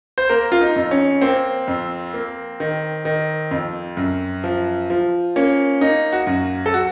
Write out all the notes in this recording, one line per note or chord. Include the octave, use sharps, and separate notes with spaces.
C5
A#3 A#4
F4
D#4
F2
C#4
A#3 C4
F2
A#3
D#3
D#3
F2
F#2
F3
F3
A#3 C#4
A#3 D#4
F#4
F#2
A4
F#4